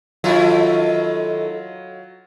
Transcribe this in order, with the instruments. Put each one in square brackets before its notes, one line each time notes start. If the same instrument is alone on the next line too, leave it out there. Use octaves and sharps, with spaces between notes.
[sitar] D#3 A3 E4 [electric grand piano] F#3 F4